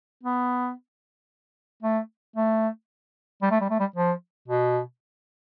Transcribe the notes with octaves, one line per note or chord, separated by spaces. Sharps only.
B3
A3
A3
G3
A3
G3
A3
G3
F3
B2